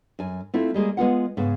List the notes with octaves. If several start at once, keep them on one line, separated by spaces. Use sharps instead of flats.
F#2 G#5
A3 C4 E4 F4
G3 G#3 A#3 G#4
G#3 B3 F4 F#5
G#2 C#3 B3